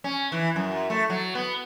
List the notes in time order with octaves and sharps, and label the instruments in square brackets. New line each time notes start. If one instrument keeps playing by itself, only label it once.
[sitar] C#4
E3
F#2
A3
F#3
B3